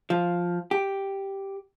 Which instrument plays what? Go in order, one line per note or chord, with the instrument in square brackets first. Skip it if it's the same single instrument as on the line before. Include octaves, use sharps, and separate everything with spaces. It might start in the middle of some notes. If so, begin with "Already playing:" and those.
[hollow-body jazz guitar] F3
G4